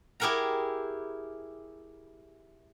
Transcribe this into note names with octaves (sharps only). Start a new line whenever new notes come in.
E4 G4 G#4 A#4 F#5 A#5